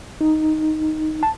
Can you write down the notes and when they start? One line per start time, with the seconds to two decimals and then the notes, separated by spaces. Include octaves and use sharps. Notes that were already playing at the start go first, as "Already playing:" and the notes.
0.21 D#4
1.23 A5